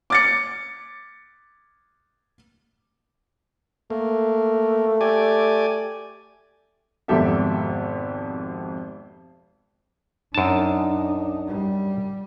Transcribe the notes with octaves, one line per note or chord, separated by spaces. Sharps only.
D6 A6 C#7
A3 A#3
G4 D5 G#5
G#1 F2 B2 G4 A4 E5
F#2 D4 D#4 A5
G3